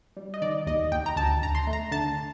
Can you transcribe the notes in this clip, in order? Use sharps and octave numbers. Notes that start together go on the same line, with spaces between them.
G3
D#5
D#3 D5
D#2 D#5
D#2 G5
A#5
D2 A5
D2 A#5
C6
A3
A#5
D3 A5